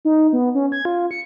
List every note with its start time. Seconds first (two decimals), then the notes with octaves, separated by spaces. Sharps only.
0.05 D#4
0.33 B3
0.55 C#4
0.72 G#6
0.85 F4
1.11 C#7